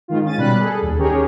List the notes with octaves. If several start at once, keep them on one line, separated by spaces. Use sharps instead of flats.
G#2 D#3 F4
C#4 A6 D#7
B2 G3 B5 F#6
G#4 A4
D#2
D#3 C#4 G4 G#4 A#4 C#5